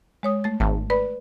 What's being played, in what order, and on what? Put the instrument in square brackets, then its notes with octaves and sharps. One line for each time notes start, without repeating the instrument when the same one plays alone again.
[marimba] G#3 C#5 D#6
A3 A6
[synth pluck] G#1 [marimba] A5
[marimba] B4 D5 B5